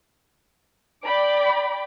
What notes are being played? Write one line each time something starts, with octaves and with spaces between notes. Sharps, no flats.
D5 G5 B5 D6